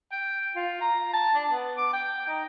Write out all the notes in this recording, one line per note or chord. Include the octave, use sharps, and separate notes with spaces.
G5
F4
A#5
A5
D4
B3
D6
G5
D#4